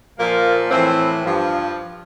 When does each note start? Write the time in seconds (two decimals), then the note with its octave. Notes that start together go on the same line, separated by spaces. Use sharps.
0.18 A#2 F3 A#3
0.71 A2 E3 C4
1.25 G2 F3